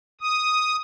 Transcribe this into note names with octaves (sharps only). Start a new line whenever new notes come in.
D#6